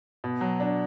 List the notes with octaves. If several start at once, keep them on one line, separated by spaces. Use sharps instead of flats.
B2
F#3
D4